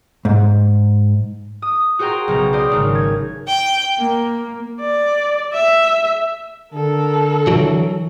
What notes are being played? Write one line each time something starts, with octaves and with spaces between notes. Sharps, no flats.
G#2
D#6
F#4 G#4 C5 G5 A#5 C6
B1 C#3 A#5
C5 D5 D#6
G#1 C#3
G#6
G5
A#3
D5
E5
D3 A4 A#4
E3 F#3